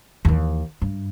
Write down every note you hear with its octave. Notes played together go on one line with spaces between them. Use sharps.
D#2 E3
G2